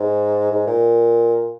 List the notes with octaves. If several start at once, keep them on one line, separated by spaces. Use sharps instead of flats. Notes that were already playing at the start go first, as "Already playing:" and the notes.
Already playing: G#2
G#2
A#2